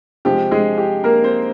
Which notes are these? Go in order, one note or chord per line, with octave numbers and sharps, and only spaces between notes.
C3 F3 G#3 G4
G#3 G#4
G4
A#3 A#4
C4 C5